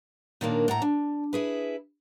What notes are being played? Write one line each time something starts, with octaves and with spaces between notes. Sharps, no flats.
A#2 D#3 F#3 A#3 D4
A2 F#5 A#5
D4
E4 G#4 B4